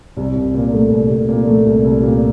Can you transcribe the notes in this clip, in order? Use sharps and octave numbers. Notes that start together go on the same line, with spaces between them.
C2
C2
A#2
A3
C2
C2
A#2
A3
C2
C2
A#2